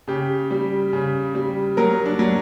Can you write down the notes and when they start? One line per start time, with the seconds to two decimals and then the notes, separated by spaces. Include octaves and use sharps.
0.07 C#3 G4
0.51 G3
0.93 C#3
1.35 G3
1.77 F#3 A#4
2.06 D4
2.19 F#3